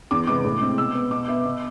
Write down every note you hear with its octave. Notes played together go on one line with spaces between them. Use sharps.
E2 D6
C3 G#3 B3 D6
A2
G#3 C4
B2 E6
B3
B2 D6
B3 E5
B2